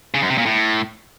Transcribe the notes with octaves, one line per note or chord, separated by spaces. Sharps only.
C#3
F#2
C3
A#2
A2